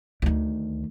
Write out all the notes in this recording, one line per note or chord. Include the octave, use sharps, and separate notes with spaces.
D2 D#3